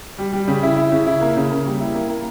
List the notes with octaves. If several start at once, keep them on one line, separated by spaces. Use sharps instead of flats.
G3
G3
C#3
E4
E4
C#3
E4
A#3
C#3
A#3
G3
E4
A#3
A#3